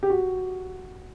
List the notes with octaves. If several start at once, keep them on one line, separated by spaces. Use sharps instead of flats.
G4
F#4